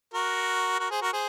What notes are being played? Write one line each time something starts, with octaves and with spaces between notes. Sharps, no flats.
F#4 A#4
F#4 A#4
G#4 C5
F#4 A#4
G#4 C5